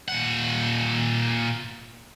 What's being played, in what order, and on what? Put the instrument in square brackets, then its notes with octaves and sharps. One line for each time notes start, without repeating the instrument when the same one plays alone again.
[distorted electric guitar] A#2 F#5